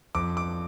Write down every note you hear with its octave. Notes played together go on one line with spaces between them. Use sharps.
F2 D6
D6